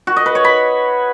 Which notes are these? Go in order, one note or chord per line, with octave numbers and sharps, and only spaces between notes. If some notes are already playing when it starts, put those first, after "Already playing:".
F#4
D#5
B4
C#5
B5